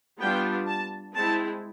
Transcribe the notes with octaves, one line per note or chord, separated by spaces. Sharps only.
G3 B3 D4 F4 G5
A5
G#3 C4 E4 A5